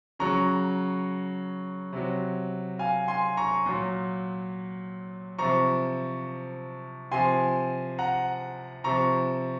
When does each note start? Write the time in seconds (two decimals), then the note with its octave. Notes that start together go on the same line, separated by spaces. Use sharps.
0.19 C#3 F#3 A#5 C#6
1.93 C3 F#3
2.79 F5 G#5
3.08 G#5 C6
3.37 A#5 C#6
3.66 A#2 F#3
5.39 C3 F3 A#5 C#6
7.11 C3 F3 G#5 C6
7.98 F#5 A#5
8.84 C3 F3 A#5 C#6